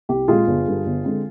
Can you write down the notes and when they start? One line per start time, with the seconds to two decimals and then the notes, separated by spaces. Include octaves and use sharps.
0.09 C2 G4
0.28 A#2 G#3 C4 F4 G#4
0.47 G1
0.67 G2 D3
0.86 G1
1.05 D3 G#3 C4